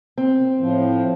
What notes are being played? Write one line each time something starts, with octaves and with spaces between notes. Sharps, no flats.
C4
A2 F3